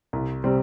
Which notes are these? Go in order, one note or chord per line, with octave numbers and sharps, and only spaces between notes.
C2
C3 G3 C4